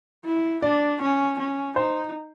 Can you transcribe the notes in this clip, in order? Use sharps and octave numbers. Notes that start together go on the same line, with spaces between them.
E4
D4 D5
C#4
C#4
D#4 C5